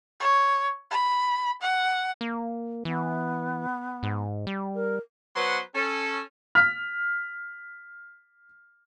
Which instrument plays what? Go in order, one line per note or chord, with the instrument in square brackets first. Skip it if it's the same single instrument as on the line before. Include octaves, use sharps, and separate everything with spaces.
[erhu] C#5
B5
F#5
[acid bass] A#3
[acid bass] E3 [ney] B3
[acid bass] G#2
G3
[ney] A#4
[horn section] F#3 B3 B4 C5 F#5 C6
C#4 A4
[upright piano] F6 B6